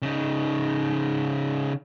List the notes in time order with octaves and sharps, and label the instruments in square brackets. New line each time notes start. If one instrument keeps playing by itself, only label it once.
[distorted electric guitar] C#3 D#4